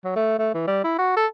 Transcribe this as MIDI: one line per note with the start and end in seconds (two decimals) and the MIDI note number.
0.05 0.12 54
0.16 0.37 57
0.39 0.50 57
0.55 0.63 52
0.67 0.80 55
0.84 0.96 64
0.99 1.14 66
1.16 1.27 69